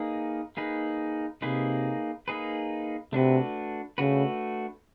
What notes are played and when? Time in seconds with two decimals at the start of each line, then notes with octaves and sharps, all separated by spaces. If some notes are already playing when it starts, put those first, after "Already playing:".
Already playing: A#3 D#4 G#4 B4
0.57 A#3 D#4 G#4 B4
1.42 C3 A#3 D#4 G#4 B4
2.28 A#3 D#4 G#4 B4
3.13 C3 A3 D4 F#4 B4
3.98 C#3 A3 D4 F#4 B4